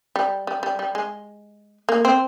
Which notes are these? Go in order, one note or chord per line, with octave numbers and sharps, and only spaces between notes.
G3
G3
G3
G3
G#3
A#3
C4